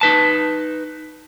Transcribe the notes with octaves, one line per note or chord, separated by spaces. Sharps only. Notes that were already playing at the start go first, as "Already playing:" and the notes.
D#4 B4 A5